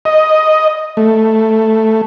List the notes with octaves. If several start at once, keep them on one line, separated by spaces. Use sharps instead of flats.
D#5
A3